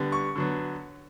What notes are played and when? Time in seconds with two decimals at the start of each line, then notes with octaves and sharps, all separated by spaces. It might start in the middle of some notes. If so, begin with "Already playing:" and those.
Already playing: D3 G3 B3
0.12 C#6
0.36 D3 F#3 B3